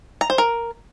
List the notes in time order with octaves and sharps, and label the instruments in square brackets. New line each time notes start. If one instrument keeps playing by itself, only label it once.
[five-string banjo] A#5
C5
A#4